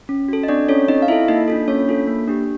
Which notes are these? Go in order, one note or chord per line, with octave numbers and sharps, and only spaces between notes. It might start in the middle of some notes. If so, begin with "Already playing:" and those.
C#4
F#4 A4
D#5
C4 D4 D5
C#4 F4 A4 C#5
C4 D#4 D#5
F5
E4 F4 A4 E5
A#3 D#4 D#5
D4 F4 A4
A#3 C#4 C#5
D4 F4 A4
A#3
D4 G4